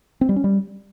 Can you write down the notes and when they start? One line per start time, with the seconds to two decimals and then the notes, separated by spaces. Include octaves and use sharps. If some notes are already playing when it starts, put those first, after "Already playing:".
0.21 C4
0.29 G3
0.36 C#4
0.44 G3